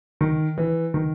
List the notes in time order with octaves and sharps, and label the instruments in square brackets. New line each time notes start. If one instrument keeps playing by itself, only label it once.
[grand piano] D#3
E3
D#3